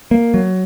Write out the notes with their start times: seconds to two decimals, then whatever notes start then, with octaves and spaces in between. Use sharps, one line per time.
0.11 A#3
0.34 F#3